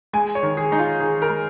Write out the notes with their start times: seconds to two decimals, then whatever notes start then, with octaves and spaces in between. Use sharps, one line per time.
0.13 G#3 G#5
0.35 C#5
0.43 D#3
0.57 G#4
0.71 G#3 D#4
0.79 F4
1.00 D#3 G#4
1.22 A#4
1.29 G#3